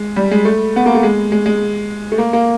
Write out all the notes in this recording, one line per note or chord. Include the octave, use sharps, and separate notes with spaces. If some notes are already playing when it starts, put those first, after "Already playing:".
Already playing: G#3
G3
G#3
A3
B3
A#3
A3
G#3
G#3
G#3
A3
A#3
A#3